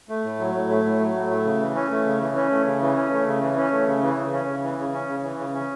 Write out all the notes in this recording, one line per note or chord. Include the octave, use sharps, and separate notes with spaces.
A3
A2
F#3
A2
A3
A2
F#3
A2
A3
C#3
E3
C#4
A3
C#3
E3
C#4
A3
C#3
E3
C#4
A3
C#3
E3
C#4
A3
C#3
E3
C#3
C#4
C#3
E3
C#3
C#4
C#3
E3
C#3
C#4